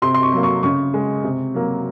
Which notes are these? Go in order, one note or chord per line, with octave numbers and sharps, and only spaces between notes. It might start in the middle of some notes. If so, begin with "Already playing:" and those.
C3 C6
C6
C#6
F#3 A#3
C#6
C#3 C#6
G#3
C3
F#3 A#3